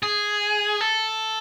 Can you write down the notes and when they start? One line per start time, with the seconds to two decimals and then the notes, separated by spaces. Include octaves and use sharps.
0.03 G#4
0.81 A4